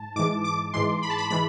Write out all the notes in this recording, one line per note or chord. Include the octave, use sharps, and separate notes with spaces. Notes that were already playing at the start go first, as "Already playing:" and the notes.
Already playing: G#2 A5
G#2 E3 G#3 D6
D6
G#2 E3 G#3 C6
B5
A5
B5
E3 G#3 B5